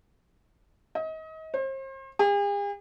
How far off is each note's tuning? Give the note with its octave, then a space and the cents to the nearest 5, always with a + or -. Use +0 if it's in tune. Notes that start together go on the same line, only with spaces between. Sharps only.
D#5 +35
C5 +40
G#4 -45